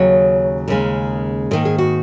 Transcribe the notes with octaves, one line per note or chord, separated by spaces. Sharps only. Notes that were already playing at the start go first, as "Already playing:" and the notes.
Already playing: D#2 C#3 F#3 C#5
D#2 C#3 G#3 A#4
G#2 D#3 A#3 A#4
G#4
F#4